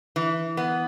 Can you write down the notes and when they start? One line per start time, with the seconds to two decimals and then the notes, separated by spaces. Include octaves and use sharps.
0.16 E3
0.57 B3